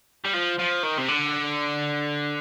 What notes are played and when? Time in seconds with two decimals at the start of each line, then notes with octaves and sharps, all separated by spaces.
0.25 G3
0.33 F3
0.59 F3
0.83 D#3
0.98 C3
1.08 D3